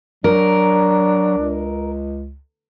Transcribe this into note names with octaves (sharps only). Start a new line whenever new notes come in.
F#3 D4 A#4
C#2